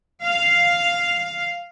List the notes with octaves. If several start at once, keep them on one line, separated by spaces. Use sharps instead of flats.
F5